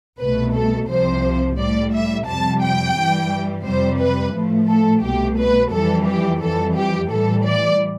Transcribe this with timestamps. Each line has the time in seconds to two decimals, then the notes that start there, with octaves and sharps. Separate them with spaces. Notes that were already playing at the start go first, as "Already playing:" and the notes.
0.19 C2 B2 A3 B4
0.54 A4
0.89 C2 C3 F3 C5
1.58 A2 G3 D5
1.92 E5
2.27 F2 C3 G3 A5
2.62 G5
2.96 G2 E3 G3
3.65 F2 C3 G3 C5
3.99 B4
4.34 A2 F3 A3
4.69 A4
5.02 C2 B2 A3 G4
5.38 B4
5.72 F2 E3 G3 A4
6.07 G4
6.41 F2 E3 G3 A4
6.75 G4
7.10 A2 E3 G3 A4
7.45 D5